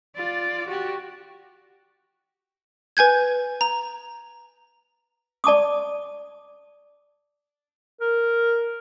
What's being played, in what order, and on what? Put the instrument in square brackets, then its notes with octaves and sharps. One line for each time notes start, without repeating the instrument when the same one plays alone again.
[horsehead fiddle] F4 D5
F#4 G4
[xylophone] B4 G#5 G6 G#6
A#5
[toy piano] D5 A5 D6 D#6
[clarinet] A#4